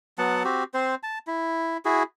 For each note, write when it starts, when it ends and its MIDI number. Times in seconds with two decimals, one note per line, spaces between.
0.18 0.43 54
0.18 0.43 59
0.18 0.43 78
0.18 0.43 81
0.45 0.64 60
0.45 0.64 66
0.45 0.64 67
0.74 0.95 60
0.74 0.95 72
1.03 1.18 81
1.27 1.77 64
1.85 2.03 64
1.85 2.03 66
1.85 2.03 68